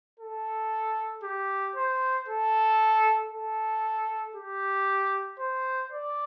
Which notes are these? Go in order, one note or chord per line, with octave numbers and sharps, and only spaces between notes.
A4
G4
C5
A4
A4
G4
C5
D5